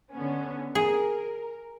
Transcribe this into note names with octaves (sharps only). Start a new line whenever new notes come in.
D3 B3 C#4
G#4 A#4